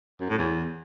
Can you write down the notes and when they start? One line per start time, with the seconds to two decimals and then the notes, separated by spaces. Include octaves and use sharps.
0.21 F#2
0.29 A2
0.38 E2